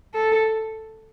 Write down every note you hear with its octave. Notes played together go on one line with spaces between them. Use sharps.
A4